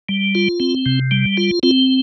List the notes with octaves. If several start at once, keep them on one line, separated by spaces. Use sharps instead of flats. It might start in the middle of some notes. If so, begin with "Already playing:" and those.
G3
F4
C4
C3
G3
F4
C4 F4